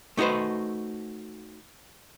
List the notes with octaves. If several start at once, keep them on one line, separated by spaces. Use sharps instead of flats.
A3 D#4 F#4 B4 C5